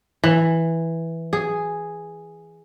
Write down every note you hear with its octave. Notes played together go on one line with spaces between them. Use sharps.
E3
G#4